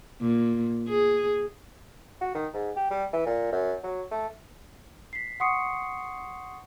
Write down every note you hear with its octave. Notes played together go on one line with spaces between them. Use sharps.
A#2
G#4
F#4
D#3
G#2
G4
G3
E3
A#2
F#2
F#3
A3
B6 C7
F#5 C6 C#6 D#6 C7 C#7